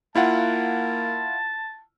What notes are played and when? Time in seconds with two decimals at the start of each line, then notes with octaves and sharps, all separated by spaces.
0.15 A#3 E4 F4 F#5 A5